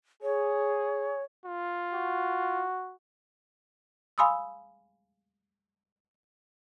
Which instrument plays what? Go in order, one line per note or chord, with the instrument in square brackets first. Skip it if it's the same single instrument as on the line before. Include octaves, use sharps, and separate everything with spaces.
[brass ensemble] G#4 [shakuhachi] C#5
[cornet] F4
[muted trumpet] F#4
[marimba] F5 G#5 B5 C6 D#6 E6